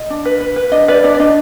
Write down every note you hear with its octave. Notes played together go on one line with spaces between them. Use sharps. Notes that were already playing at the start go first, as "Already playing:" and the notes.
Already playing: D#5
D4
B4
B4
B4
D4 D#5
B4 D5
D4 D5
D5
D4 D#5